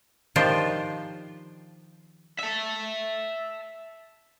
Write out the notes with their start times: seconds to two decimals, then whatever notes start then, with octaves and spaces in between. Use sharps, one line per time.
0.36 D#3 F3 D4 F4 G4 C5
2.39 E5 A5